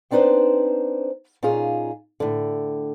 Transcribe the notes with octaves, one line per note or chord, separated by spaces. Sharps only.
B3 C4 D4 D#4 B4 C5
A#2 C#4 D#4 F4 G#4
A2 D3